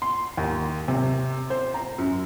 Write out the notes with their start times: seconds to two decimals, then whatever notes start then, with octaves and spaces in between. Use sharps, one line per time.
0.02 C6
0.37 D#2
0.88 C3
1.50 C5
1.74 A#5
1.98 F#2